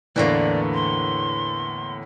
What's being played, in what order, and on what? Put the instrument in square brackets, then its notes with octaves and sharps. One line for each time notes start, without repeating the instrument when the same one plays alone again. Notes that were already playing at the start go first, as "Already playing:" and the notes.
[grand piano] E2 A2 D3 [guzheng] E3 A3 A#3 [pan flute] D5
[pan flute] C6